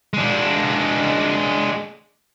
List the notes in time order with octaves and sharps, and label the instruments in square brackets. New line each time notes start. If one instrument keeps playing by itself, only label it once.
[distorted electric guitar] G#3 D4